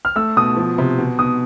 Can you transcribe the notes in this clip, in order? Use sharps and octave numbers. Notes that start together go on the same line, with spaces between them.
F6
A3 E6
B2 D#6
F3
C3
B2
B2 D#6